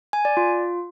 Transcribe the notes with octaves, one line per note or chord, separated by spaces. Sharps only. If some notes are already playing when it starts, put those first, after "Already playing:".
G#5
D5
F4